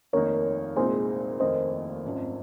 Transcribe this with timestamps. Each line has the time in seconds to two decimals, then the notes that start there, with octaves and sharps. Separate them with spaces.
0.13 F1 D#2 D#3 A#3 D#4 A#4 C#5
0.76 C2 A#2 G#3 C4 D#4 G#4 C5
1.40 F1 D#2 D#3 A#3 C5 D#5
2.04 G#1 F#2 F3 C4